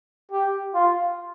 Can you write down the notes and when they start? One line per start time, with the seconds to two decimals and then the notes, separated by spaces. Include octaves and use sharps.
0.32 G4
0.74 F4